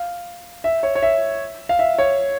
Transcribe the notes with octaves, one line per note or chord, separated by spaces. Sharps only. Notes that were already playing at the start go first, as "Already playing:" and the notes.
Already playing: F5
E5
C#5
C#5
E5
F5
E5
C#5